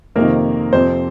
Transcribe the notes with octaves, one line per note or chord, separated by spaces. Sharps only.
F2 C3 D#3 A#3 A#4
F2 C3 F3 C4 C5